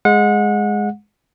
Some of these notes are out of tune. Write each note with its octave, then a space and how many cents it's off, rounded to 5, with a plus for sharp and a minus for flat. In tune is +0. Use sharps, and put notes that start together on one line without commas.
G#3 +0 F#5 -30